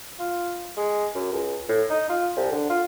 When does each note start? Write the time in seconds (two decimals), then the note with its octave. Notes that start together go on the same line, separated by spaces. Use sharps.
0.19 F4
0.77 G#3
1.15 F#2
1.33 C#2
1.69 A2
1.90 D#4
2.09 F4
2.37 C2
2.52 D3
2.70 F4